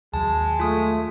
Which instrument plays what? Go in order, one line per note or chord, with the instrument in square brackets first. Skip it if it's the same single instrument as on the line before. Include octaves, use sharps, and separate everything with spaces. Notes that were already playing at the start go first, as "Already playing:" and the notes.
[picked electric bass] D#2 D#3 F#3 [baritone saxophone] G#3 [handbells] A5
[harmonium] A3 [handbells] F4 D#6